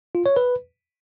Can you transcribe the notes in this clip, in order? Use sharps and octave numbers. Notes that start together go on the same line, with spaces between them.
F4
C#5
B4